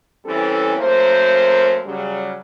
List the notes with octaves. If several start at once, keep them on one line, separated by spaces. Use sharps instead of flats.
E3 G3 C4 C#4 A4
F#2 A3 A#3 C5
C#3 F#3 G3